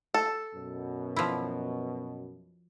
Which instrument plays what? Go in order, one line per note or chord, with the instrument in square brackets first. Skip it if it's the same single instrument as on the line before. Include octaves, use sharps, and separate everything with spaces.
[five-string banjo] A4
[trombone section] F#2 B2
[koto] F3 E4